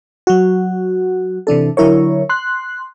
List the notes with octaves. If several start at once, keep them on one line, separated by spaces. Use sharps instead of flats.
F#3 F#4
C3 E3 D4 A4
D3 F#3 E4 A#4 C#5
C6 F#6